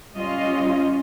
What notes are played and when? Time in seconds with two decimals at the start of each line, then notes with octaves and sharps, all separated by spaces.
0.15 G3 C#4 F4 D#5